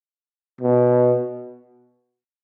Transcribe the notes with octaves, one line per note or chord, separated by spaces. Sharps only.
B2